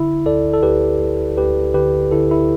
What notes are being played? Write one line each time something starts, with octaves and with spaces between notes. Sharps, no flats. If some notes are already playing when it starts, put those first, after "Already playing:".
Already playing: D3 E4
D2 A4 D5
A4
D2 G4 B4
D2
D2 G4 B4
D3 G4 B4
D3 E4 A4
E4